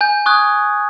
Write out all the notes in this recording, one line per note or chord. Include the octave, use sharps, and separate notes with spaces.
G#5 G6
C#6 D#6 F#6 G#6